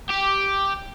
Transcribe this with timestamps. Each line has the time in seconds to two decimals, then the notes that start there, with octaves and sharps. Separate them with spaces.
0.10 G4